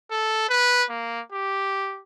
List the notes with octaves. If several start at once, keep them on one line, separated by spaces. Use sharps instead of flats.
A4
B4
A#3
G4